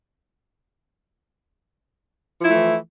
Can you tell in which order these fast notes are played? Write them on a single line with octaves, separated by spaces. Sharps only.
F3 E4 A3 E3